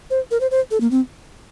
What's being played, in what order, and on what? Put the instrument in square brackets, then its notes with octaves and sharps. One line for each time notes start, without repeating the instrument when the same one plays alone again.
[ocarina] C5
A#4
C5
C5
A4
A#3
C4